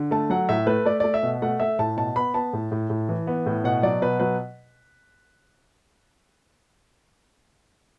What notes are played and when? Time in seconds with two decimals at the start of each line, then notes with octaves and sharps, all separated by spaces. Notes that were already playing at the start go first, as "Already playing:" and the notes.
Already playing: D3
0.11 A3 A5
0.30 F#3 F#5
0.49 A2 E5
0.67 A3 B4
0.85 A3 D5
1.00 A3 D5
1.14 E5
1.23 B2
1.42 A3 F#5
1.60 A3 E5
1.79 A2 A5
1.97 B2 A5
2.16 B3 B5
2.34 B3 A5
2.53 A2
2.72 A2
2.90 A2
3.09 E3
3.27 B3
3.46 A2
3.64 B2 F#5
3.83 F#3 D5
4.02 B2 B4
4.20 F#3 B4